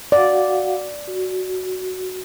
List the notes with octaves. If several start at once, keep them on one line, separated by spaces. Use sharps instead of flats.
F#4 D5 F5 F#5
F#4